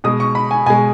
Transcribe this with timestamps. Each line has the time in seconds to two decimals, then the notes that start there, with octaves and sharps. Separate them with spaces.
0.04 B2 G#3 D#6
0.20 C#6
0.35 B5
0.51 G#5
0.66 B2 G#3 G#5